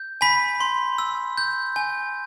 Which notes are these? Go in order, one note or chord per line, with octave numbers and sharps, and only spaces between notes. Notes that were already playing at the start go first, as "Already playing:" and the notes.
Already playing: G6
G#5 B5 B6
C6
E6
G6
G#5